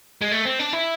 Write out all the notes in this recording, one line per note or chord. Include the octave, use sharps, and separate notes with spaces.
G#3
A3
C4
D4
E4